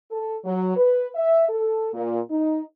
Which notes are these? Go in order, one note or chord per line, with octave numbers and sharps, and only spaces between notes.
A4
F#3
B4
E5
A4
A#2
D#4